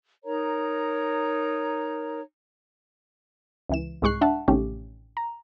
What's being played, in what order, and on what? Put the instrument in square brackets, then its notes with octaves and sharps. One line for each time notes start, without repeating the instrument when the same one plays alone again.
[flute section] D#4 A#4 C#5 A#5
[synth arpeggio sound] C#2 E3 E7
C2 G#2 G#3 C#6 F#6 C7
D4 E5 F#5 A5
A1 C3 D#3 A3 C#4 G4
A#5